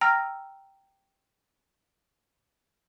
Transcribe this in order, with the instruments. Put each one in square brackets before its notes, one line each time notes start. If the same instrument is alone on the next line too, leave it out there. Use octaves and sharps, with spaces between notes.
[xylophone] G5 A#5 E6 F6 A#6